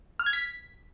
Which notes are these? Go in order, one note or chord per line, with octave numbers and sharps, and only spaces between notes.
F6
G#6
B6